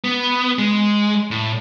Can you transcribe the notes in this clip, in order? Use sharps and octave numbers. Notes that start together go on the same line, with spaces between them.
B3
G#3
A2